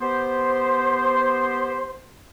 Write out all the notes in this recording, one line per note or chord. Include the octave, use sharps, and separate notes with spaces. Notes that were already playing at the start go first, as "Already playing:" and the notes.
B3 G4 C5